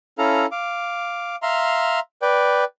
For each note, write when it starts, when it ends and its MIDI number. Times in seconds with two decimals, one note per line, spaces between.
0.18 0.46 61
0.18 0.46 64
0.18 0.46 69
0.18 0.46 77
0.18 0.46 82
0.52 1.36 77
0.52 1.36 86
1.42 2.00 76
1.42 2.00 77
1.42 2.00 82
1.42 2.00 84
2.22 2.64 71
2.22 2.64 74
2.22 2.64 79